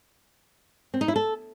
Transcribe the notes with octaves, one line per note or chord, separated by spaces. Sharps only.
C4
D#4
E4
A4